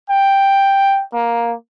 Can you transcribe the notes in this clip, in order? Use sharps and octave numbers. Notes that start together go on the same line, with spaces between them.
G5
A#3